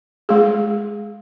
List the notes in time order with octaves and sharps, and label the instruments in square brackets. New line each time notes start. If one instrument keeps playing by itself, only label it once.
[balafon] G#3 G#4